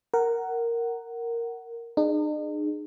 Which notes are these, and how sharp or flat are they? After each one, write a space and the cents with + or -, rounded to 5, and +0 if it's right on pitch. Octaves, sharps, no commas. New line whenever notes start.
A#4 -5 F#5 +15
D#4 -45 G#4 +0